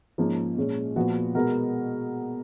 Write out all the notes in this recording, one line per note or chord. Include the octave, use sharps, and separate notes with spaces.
G#2 F3 A#3 C#4
A#2 G#3 C#4
A#2 F3 B3 F#4
B2 G#3 B3 F#4 A#4